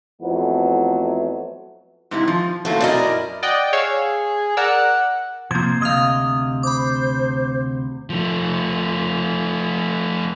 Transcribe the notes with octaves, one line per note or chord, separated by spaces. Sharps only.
F2 E3 F#3 A3 B3
G#2 C3 E4
F3
F#3 A3 A#3 C5
F#2 E4 A#4 D5 D#5
D5 D#5 F#5 G5
G#4 C#5 F5 E6
A#4 D5 F#5 E6
C3 F3 A#3 C5 G#6
D2 C3 D#5 F5 F6 G#6
C5 B5 D6
F3 A3